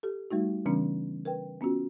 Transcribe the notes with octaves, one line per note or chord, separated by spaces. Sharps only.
G4 A4
G3 A3 D#4 F#4
C#3 E3 G3 B3 C#4 D4
A#4 B4 G5
B3 C#4 F4 F#4